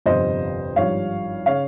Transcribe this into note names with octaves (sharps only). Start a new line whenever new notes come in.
G1 F2 C3 C5 D#5
G#1 G2 F3 C#5 F5
C#3 C#5 F5